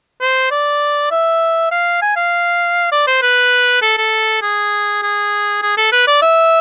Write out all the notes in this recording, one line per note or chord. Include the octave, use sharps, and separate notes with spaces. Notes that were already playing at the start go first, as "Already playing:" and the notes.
C5
D5
E5
F5
G#5
F5
D5
C5
B4
A4
A4
G#4
G#4
G#4
A4
B4
D5
E5